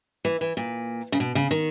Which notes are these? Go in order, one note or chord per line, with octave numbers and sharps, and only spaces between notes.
E3
E3
A#2
C#3
B2
C#3
D#3